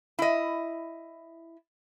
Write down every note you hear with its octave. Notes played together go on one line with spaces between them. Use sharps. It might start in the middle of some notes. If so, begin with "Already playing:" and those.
E4 D#5